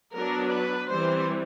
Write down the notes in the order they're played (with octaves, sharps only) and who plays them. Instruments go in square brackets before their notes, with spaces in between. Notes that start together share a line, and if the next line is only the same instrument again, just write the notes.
[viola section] F#3 B3 D4 A#4
B4
E3 G3 C4 C5